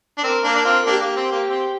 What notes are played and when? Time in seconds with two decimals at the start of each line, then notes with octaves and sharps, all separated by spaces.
0.18 D4
0.23 C4 A#4
0.44 A#3 D4
0.55 D4
0.65 C4 F4
0.86 A#3 D4 G4
1.01 A#3
1.17 C4
1.32 A#3
1.48 C4